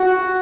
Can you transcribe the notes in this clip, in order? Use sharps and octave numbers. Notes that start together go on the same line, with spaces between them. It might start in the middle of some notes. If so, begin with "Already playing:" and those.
Already playing: F#4